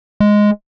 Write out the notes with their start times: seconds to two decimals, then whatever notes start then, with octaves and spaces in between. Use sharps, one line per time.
0.20 G#3